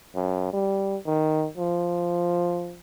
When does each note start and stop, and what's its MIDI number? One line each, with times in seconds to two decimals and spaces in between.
0.16 0.48 42
0.53 0.96 55
1.06 1.46 51
1.57 2.78 53